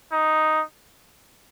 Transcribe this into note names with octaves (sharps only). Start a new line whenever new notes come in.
D#4